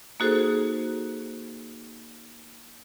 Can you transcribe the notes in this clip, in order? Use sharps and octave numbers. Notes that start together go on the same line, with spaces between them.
A#3 D#4 F#4 G#4 A4 C5